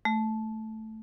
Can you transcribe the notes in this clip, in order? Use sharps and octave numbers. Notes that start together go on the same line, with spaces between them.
A3